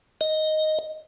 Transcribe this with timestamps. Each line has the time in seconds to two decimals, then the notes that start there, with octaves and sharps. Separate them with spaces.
0.21 D#5